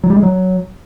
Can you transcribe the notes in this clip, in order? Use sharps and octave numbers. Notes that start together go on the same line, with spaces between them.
F#3
G3
G#3
F#3